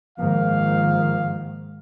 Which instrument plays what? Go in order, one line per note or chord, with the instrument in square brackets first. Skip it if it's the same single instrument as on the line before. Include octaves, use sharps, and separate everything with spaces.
[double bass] G#2 D#3 [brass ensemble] F3 A#3 F5